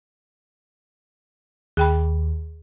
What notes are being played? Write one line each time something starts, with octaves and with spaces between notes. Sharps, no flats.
D#2 G#4 G5 B5